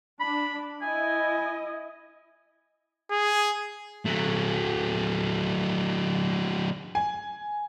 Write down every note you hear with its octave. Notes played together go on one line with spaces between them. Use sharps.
D4 B5
E4 D#5 G#5
G#4
F#3 A3
G#5